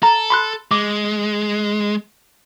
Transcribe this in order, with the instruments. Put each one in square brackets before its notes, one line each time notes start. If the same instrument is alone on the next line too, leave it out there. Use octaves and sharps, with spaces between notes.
[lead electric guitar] A4 [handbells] A#5
[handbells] B5 C6 F#6
[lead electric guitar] G#3 [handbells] D6